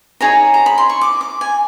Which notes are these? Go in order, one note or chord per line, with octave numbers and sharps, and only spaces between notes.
D#4 G#4 C#5 A#5
A#5
B5
C6
C#6
D6
D6
G#5